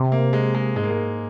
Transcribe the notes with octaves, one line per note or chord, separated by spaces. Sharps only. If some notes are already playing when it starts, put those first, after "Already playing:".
Already playing: C3
A#3
G#3
G#3
G#2 G#3
A#3
G#3